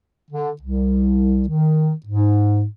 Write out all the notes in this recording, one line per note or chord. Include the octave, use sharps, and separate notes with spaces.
D3
C2
D#3
G#2